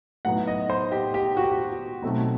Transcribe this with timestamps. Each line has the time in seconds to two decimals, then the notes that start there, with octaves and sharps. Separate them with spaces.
0.25 A2 F#3 B3 D#4 F#5
0.47 D#5
0.70 C5
0.92 G4
1.14 G4
1.37 F#4
1.44 G4
1.52 F#4
2.02 B2 F#3 A3 C4 D#4